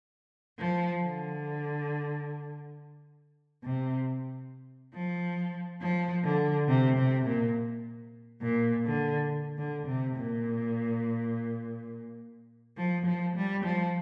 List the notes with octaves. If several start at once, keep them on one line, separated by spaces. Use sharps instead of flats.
F3
D3
C3
F3
F3
D3
C3
C3
A#2
A#2
D3
D3
C3
A#2
F3
F3
G3
F3